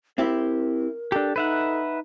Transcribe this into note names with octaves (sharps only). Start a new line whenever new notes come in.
C4 E4 G4 A#4
D4 G4 A4
D#4 B4 E5 F#5